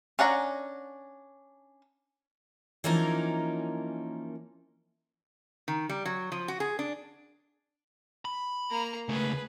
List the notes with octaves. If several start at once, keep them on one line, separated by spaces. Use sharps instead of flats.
C#4 D4 F#5 A#5
E3 F3 A#3 C#4 D#4 A#4
D#3
G3
F#3
F3
F#4
G#4
D4
B5
A#3 A#5
C#2 A3 G#4 B4